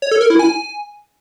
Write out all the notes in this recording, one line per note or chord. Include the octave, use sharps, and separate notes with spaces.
C#5
A4
A#4
E4
G#5